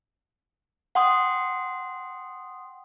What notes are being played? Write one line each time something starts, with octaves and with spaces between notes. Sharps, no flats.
F#5 G5 C6 D#6